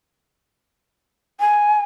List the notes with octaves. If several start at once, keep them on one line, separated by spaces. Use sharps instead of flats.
G#5